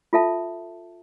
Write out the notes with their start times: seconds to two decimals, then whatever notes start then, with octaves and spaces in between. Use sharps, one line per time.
0.13 F4 A4 E5 A5